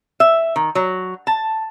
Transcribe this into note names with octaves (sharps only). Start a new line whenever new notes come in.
E5
D#3
F#3
A5